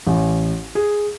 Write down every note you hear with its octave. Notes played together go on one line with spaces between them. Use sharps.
A1
G#4